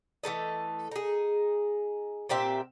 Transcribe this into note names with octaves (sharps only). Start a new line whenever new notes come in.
E3 A3 A4 D#5
D#4 G#4
A#2 C4 G4 E5